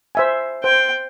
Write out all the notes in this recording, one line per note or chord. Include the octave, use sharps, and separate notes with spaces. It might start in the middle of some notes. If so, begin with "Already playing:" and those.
C5 E5 G#5
C5 G5